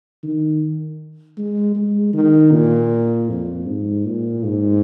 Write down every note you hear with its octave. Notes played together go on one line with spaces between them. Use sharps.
D#3
G#3
G#3
D#3
A#2
F2
G#2
A#2
G#2